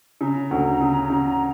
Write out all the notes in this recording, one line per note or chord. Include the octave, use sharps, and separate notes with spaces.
C#3 A#5
D2
C#3
C#3